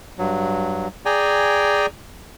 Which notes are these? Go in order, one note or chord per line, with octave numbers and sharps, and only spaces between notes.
G2 F#3
G#4 D5 G5 G#5 A#5